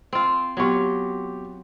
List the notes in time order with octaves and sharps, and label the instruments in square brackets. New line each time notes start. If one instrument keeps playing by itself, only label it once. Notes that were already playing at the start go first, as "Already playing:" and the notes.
[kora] C4 F4
[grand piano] B2 G4 C#6 [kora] F#3 F4